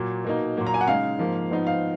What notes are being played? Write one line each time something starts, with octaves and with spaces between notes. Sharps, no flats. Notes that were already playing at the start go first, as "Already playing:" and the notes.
Already playing: A#2 F#3 A#3
B2 A#3 D#4
A#2 F#3 A#3
A#5
G#5
F#5
C#3 G#3 D#4 F5
G#2 F3 A#3
G#2 F3 B3 D#4
F5